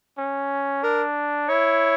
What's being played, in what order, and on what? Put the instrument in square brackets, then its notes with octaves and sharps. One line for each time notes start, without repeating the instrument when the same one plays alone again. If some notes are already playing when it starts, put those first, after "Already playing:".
[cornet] C#4
[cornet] D4 [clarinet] A#4
[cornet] E4 [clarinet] C#5